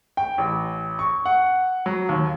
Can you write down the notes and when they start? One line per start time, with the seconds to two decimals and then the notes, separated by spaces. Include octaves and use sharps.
0.17 G5
0.38 A1
0.99 C#6
1.25 F#5
1.86 F#3
2.09 D#2